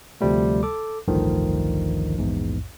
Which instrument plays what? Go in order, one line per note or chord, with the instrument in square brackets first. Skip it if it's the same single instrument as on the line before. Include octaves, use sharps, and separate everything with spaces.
[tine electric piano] D2 C3 F3 G3 A3
A4 D6
A1 D2 G2 D3 D#3 F3
A#1 E2 G#2